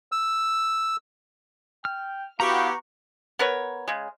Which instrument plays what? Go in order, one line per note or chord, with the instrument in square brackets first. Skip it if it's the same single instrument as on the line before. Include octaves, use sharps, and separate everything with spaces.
[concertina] E6
[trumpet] G5 [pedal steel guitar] F6
[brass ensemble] B3 E4 [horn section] F#4 G4 [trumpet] F5 [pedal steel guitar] A#5 C#6
[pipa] B3 A#4 B4 C#5
C#3 G#3